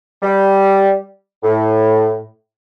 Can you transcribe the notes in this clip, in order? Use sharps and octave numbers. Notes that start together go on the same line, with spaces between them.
G3
A2